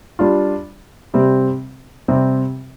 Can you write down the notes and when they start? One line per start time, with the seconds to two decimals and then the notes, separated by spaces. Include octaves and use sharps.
0.19 G3 D4 F4
1.14 C3 G3 C4
2.08 C3 G3 C4